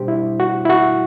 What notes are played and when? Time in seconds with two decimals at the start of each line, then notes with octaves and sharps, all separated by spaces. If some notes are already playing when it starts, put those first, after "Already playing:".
Already playing: B2 G3 D4 G4 C5
0.08 E4
0.40 F#4
0.65 E4
0.70 F#4